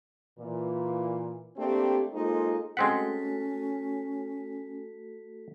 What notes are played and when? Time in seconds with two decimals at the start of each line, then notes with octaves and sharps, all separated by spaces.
0.39 A#2 E3
1.57 A3 A#3 C4 D4 G4
2.14 G#3 A#3 D#4 F4 A4 C5
2.77 G#3 A3 C4 C#4 F#4 A4 F#5 B6